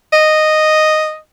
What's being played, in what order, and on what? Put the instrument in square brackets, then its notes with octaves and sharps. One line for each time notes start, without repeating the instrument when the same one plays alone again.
[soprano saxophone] D#5